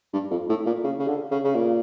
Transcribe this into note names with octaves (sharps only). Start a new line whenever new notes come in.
G2
F2
A2
A#2
C#3
C#3
D3
C#3
C#3
A#2